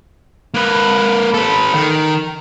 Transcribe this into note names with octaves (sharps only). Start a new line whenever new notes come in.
A#3 B4
A4 B4
D#3